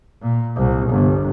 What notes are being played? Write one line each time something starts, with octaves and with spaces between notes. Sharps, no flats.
A#2
C2
G1